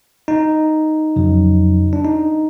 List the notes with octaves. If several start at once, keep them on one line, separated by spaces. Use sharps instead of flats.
D#4
F2 C#3 F#3
D4
D#4